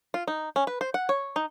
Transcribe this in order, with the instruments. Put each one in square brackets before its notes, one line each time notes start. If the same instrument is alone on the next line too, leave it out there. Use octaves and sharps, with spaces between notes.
[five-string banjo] F4
D#4
C#4
B4
C5
F#5
C#5
D#4